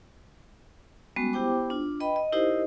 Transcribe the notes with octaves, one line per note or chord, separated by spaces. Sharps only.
G3 G#3 B3 C#4 F#4
B3 E4 G4 C5 G5 D6
D4 F4
B4 D#5 G5 B5
D#5
D#4 E4 G4 A#4 C5 D#5